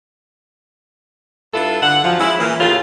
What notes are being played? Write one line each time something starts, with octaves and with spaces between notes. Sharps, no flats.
G2 D4 E4 F4 A4
D3 F#5
F#2 F3
G#3 C#4 E4
A#2 E3
D#2 A2 C#3 F4